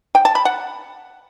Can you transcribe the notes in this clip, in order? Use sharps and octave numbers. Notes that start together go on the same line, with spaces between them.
G5
A5
B5
F#5